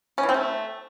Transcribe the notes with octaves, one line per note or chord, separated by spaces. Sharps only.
C#4
E3
C4
A3